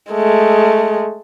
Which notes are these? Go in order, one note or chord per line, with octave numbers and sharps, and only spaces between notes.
G#3 A3